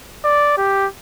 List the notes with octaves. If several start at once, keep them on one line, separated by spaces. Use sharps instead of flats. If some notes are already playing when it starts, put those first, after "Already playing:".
D5
G4